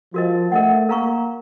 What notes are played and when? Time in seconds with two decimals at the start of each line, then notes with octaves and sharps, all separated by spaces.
0.14 F3 F#4 A#4 D#5
0.52 A3 A#4 D#5 F#5
0.89 A#3 A#4 F5 A#5 C#6